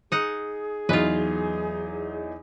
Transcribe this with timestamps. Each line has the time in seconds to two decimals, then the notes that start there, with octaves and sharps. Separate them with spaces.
0.12 D#4 G#4 F#5
0.89 E2 F#3 D#4 F4 B4